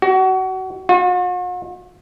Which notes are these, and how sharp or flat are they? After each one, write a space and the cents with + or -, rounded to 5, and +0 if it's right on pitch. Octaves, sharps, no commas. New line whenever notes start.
F#4 +30
F#4 -45